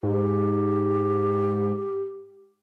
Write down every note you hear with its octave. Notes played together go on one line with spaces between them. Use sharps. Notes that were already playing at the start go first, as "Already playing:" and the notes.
G#2 G4